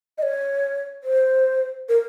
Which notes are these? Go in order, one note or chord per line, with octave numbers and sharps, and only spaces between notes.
D#5
C#5
C5
A#4